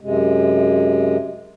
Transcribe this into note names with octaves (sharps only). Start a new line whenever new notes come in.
F#2 C3 G#3